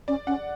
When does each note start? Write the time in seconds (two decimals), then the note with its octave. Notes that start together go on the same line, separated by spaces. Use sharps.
0.08 C#4 D5
0.27 C#4 F#5